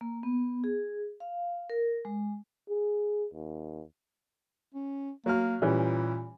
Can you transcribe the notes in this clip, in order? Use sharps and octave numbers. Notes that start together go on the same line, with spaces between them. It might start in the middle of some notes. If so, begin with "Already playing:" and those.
A#3
B3
G#4
F5
A#4
G#3
G#4
D#2
C#4
F#3 A#3 F6
A#2 E3 G3 C#4